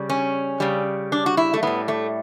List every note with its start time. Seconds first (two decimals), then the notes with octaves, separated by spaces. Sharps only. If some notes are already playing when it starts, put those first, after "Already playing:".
Already playing: C#3 G3
0.10 C#4
0.60 C#3 G3
1.12 D4
1.26 F#4
1.37 E4
1.54 A3
1.63 A2 G3 B3
1.88 A3